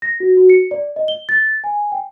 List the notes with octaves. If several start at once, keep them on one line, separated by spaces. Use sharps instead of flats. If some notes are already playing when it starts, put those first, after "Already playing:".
A#6
F#4
F#4
C#7
D5
D#5
G7
A6
G#5
G5